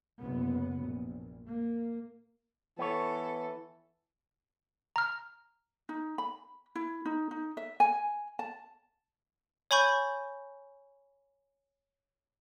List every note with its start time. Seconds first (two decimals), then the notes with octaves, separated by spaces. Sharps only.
0.19 F#1 F#2 C3 B3
0.81 A#1
1.48 A#3
2.79 E3 B3 A4 C#5
4.96 A#5 F6
5.89 D#4
6.18 B5
6.75 E4
7.05 D#4
7.31 D#4
7.57 E5
7.80 G#5
8.39 A5
9.71 C#5 G#5 B5 C#6 G6